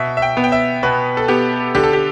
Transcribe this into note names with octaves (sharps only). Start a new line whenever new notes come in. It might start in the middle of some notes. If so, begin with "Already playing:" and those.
Already playing: B2 E5
E5
G5
B3
G5
E5
B2 B4
A4
B3 G4
D3 G4
A4
G4